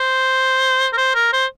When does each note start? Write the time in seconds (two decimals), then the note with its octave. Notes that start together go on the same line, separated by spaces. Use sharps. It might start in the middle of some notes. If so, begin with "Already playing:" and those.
Already playing: C5
0.93 A#4
0.98 C5
1.15 A#4
1.33 C5